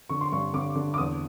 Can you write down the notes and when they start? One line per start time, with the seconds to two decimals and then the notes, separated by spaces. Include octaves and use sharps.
0.10 D3 C#6
0.21 C6
0.32 G2 C#6
0.53 D3 D6
0.75 D3
0.94 D6
0.98 E2 D#6